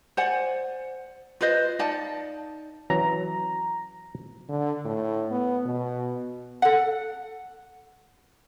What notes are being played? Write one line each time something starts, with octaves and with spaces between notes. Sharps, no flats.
C5 D5 F#5 G#5
F4 B4 C5 D#5
D#4 D5 F5 A5
E3 F#3 C#4 A#5
D3
A2
B3
B2
A4 F#5